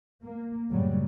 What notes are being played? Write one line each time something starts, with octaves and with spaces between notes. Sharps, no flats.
A#3
A1 F#2 C#3 F#3 G3